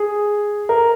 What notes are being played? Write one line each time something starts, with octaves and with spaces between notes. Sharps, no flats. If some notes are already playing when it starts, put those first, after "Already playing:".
Already playing: G#4
A#4